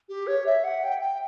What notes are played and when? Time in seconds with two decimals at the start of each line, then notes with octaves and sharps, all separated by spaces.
0.09 G4
0.27 C#5
0.46 E5
0.64 F#5
0.83 G5
1.01 G5